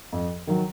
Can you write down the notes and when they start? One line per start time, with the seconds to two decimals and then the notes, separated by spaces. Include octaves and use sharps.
0.13 F2
0.47 D#3 F#3